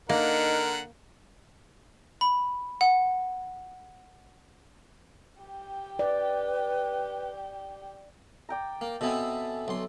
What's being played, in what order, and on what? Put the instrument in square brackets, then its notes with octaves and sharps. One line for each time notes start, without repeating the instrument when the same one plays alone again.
[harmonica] D3 F#5 [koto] A#3 [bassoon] D#4 [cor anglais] A#4
[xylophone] B5
F#5
[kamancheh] G4 G5
[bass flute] B4 [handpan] D5
[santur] D5 G5 A#5
[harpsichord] A#3
[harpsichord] B2 B3 C4 [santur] A4 E5 G#5
[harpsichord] B1 C6